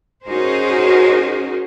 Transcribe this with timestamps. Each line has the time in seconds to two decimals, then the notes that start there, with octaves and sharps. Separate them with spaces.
0.24 C#4 D#4 F#4 G#4 A#4 C5